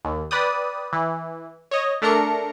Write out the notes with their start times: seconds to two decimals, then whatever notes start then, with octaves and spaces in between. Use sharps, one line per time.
0.05 D#2
0.31 B4 D5 G5 D#6
0.93 E3
1.71 C#5 D#5
2.02 A3 D4 A#4 A#5 C#7